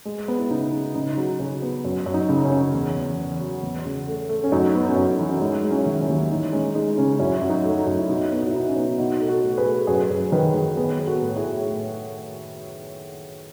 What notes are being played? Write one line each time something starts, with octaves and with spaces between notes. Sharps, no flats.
G#3
B3
E4
C#3 D#4
C#3
C#3 D#4
F#3
C#3 C#4
B3
F#2
F#2
D#4
C#3
C#4
C#3
E2
E2
E2
F#3
E2
C#3
A3
A3
C#4
F#2 D#4
B3
C#4
F#2 D#4
E3
C#4
G#3 D#4
G#3
C#4 E4
D#3
C#4 E4
D#2
E3 D#4
G#3 C#4
G#3 D#4
C#3 C#4
F#2 C#4 E4
F#2
D#4 F#4
A3
D#4
F#2
E4
B2 D#4
B3
D#4
E4
B2 D#4
C#4
B3
B2 D#4
A3
F#4 A4
A3
G#4 B4
A3
F#2 G#4 B4
F#2
D#3 G#4 B4
D#3
B3 G#4 B4
B3
F#4 A4
A2
E4 G#4
A2